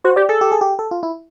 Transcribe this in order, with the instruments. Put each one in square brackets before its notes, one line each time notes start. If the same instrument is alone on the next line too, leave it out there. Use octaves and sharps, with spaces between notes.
[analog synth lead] F#4 [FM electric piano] C5
[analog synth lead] G4 [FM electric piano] D5
[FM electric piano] G#4 [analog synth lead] A4
[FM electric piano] G4
G#4
G4
A4
F4
E4